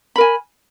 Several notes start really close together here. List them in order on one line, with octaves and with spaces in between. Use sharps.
B5 A#4 G#5